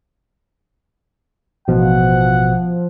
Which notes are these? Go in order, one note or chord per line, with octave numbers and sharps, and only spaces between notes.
A1 B2 F3 F#5